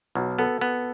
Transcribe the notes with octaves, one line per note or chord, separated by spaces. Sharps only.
B1 F#4
B3 A4
B3